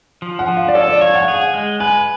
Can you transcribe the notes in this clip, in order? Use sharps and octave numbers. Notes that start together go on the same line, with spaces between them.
F3
F#5
F3
F5
D5
A4 C#5
D5
C#5 F5
F#5
G#4 F5
F#5
G#3
B4 G#5